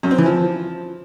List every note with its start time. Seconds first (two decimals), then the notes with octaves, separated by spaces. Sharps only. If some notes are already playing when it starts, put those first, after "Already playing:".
0.03 F#2
0.11 C4
0.18 E3
0.26 F3